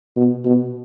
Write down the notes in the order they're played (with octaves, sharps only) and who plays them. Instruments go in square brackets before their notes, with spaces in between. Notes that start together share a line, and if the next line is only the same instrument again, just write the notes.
[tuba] B2
B2